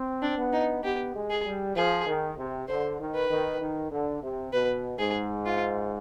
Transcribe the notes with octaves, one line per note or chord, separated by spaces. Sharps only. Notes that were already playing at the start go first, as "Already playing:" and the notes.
Already playing: C4
D4
B3
D#4
B3 G4
G#3
G#4
G3
F3 G#4
D#3
C3
D3 C5
D#3
B4
D#3
D#3
D3
C3
B2 B4
G#2 G#4
F4